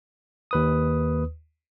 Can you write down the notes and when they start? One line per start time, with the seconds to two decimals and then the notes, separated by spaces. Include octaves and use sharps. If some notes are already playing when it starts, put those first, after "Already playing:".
0.51 D#2 B4 D#6